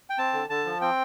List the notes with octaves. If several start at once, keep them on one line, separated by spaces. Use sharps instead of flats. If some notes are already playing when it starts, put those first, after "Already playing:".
G5
C4 A5
D3
D3 A5
F3
C4 G5